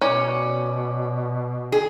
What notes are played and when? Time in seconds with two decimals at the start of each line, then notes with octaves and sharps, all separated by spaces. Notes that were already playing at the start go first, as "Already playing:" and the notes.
0.01 B2 C#4 C#5 D5
1.72 G#4